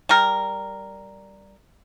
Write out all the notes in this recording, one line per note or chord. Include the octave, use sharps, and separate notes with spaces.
G3 A#4